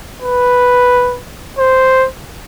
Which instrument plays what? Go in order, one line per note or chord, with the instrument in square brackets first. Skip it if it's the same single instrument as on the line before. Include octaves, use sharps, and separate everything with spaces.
[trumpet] B4
C5